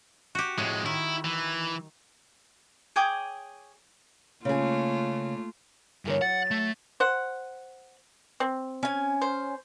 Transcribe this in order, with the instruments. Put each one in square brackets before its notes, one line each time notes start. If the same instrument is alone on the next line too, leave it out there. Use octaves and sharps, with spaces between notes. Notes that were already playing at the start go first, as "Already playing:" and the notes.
[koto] F#4 G4
[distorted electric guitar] F2 G#3 [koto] A2
[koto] D#3 [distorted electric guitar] E4
[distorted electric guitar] E3
[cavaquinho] G#4 C#5 G5 D6
[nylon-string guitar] C#3 G#4 [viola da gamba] A3 A#3 F4
[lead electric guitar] G2 D3 [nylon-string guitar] E3 A#4 C#5
[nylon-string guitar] F#3 [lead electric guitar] F#5 [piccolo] A6
[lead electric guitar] A3
[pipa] C5 F#5
C4
[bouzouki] C#4 G#5
[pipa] C5